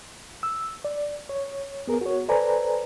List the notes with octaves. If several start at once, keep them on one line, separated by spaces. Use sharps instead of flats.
E6
D5
C#5
B3 G#4 A#4
F#4 C#5
A4 B4 C5 D5 G#5 A#5